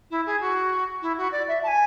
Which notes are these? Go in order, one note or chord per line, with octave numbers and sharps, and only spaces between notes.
E4
G#4
F#4
E4
F#4
D5
E5
A5
G#5